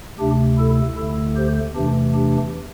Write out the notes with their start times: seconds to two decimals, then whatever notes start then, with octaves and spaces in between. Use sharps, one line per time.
0.19 D2 C3 A3 D4 G4
0.58 E4 A4
0.97 D2 D3 A3 E4 A4
1.36 G4 C5
1.75 E2 C3 E3 A3 D4 G4
2.14 D4 G4